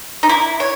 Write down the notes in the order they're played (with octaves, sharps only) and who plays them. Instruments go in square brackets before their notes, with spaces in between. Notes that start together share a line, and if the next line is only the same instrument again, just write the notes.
[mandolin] D#4
E4
C#5